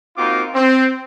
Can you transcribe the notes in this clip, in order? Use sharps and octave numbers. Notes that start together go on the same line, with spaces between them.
A#3 C4 D#4 F4 F#4 D6
C4